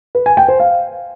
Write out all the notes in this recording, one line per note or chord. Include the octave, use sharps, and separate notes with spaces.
B4
G#5
G5
C5
F5